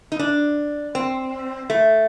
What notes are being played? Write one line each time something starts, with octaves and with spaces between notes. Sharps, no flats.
D#4
D4
C4
A3